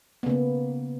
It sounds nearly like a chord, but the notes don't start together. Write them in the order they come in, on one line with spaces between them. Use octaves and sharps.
B3 C#3 A#3